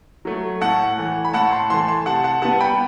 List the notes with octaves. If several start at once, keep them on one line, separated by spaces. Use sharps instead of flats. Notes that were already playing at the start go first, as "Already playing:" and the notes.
F#3 A3
A2 F#5 A5
E3 A3
B5
A2 F#5 A5
A5 C6
E3 A3 A5 C6
A5 C6
C3 F#5 A5
F#5 A5
G3 B3 F#5 A5
G5 B5